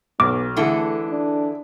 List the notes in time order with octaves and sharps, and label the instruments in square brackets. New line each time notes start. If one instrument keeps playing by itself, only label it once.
[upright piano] B1 [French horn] B3 [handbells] D6
[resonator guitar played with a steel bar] D3 E3 A4 [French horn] A3 [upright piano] E4 G#4
[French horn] D4